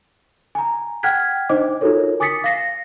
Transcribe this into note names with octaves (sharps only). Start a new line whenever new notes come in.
G#5 A#5
F#5 G5 F6 F#6 G#6 B6
D4 D#4 C5 D#5 D6
D#4 F4 F#4 A4 A#4 C#5
G#5 D6 D#6 A6 B6 C#7
F5 A#6 C7